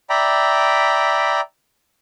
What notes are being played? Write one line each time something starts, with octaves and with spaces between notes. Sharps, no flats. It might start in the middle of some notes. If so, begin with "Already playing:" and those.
D5 E5 G5 A#5 B5